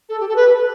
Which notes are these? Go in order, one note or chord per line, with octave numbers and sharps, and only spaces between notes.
A4
G4
A4
B4